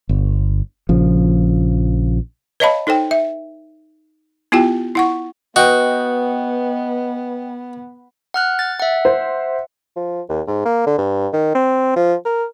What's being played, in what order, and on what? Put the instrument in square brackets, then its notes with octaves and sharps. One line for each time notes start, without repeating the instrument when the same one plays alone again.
[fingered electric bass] G1
A#1 C#3 F3
[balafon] B4 C#5 D#5 F5 A5 B5
D#4 A4 C5 G5
E5
B3 E4 F4 G4 G5
E4 F#5 C#6
[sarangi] B3 [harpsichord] F#4 [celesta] B4 [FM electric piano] D#5 G5
[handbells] F#5 F6 F#6
A6
E5 F#5
[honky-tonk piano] C5
[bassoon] F3
D#2
G#2
A#3
D3
G2
D#3
C4
F3
A#4